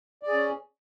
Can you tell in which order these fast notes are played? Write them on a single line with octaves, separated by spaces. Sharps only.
D5 G#4 C#4